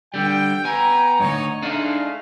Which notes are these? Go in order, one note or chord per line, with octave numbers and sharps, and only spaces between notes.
D3 G3 G5
B3 G5 G#5 A#5
D2 G2 D#4 C#5
G#3 A3 D4 D#4 F5